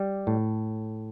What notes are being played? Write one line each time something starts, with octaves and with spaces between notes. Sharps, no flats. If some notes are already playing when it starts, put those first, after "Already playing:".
Already playing: G3
A2